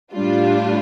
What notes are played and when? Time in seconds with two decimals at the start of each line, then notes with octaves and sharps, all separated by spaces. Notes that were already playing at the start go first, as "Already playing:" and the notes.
0.13 A2 G3 D4 F4